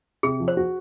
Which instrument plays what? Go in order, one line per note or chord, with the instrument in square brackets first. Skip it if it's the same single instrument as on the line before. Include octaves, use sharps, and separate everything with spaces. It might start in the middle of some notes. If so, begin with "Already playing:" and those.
[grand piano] C3 [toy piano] G#4
[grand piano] F3
[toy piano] C5
[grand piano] F#4